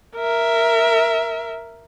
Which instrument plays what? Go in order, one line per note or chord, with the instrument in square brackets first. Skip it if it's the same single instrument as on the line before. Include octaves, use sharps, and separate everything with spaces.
[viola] A#4 E5